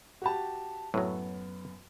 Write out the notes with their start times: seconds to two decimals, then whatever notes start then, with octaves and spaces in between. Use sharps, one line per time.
0.22 F#4 G4 A5
0.94 F#2 A2 F#3 B3